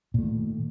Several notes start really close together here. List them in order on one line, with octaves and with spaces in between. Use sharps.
A#2 A3 D#3